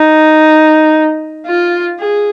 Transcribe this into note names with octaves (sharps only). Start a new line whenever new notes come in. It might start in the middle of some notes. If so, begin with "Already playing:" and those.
Already playing: D#4
F4
G#4